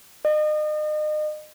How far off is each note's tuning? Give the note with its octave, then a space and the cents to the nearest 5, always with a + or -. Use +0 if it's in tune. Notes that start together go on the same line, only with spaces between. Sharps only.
D#5 -35